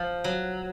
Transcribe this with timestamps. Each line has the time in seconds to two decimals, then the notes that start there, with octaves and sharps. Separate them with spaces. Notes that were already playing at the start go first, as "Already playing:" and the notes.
Already playing: F3
0.24 F#3